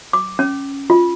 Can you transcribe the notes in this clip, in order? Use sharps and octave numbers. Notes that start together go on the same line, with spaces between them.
D6
C#4
F4